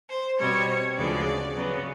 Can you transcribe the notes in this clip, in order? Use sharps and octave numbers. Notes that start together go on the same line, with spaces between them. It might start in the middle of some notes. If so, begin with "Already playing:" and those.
C5
B2 G3 C4 C#5
D2 C#3 F3 G#3 B3 D5
C#3 F#3 B3